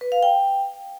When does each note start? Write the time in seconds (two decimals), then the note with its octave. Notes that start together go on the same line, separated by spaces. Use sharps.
0.01 B4
0.12 F5
0.23 G5